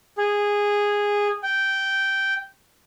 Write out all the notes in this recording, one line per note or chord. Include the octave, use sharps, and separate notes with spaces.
G#4
G5